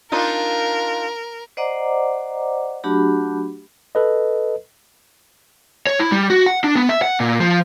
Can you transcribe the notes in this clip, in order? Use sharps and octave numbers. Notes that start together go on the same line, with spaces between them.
D4 D#4 F4 A#4
C5 D5 D#5 F#5 A#5 D6
F#3 A3 D4 F#4 G4 B5
A4 B4 D#5
C#5
E4
G3
F#4
F#5
D4
B3
E5
F#5
A#2
F3